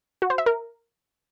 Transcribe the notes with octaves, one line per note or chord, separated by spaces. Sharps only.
F#4
C5
E5
A#4